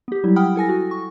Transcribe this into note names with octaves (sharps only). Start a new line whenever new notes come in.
B3 G4
F#3 G3 E4
F#5 G5 B5 D#6 F6
E4 A4 G#5 A#6
F#4
C#6